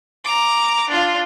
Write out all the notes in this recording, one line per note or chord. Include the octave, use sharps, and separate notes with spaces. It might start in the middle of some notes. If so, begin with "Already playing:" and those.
A#5 D6
D4 F4